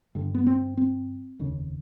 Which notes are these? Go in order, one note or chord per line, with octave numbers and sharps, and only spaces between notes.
G1 G2 D3
B3
C4
C4
F1 D#2 C#3